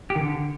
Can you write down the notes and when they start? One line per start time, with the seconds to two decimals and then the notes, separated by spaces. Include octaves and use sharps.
0.10 G4
0.16 D#3
0.21 D3